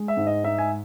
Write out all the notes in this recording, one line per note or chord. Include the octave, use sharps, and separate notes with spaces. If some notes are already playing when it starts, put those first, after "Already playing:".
Already playing: G#3
E5
G#2
D#5
D#4 E5
G#5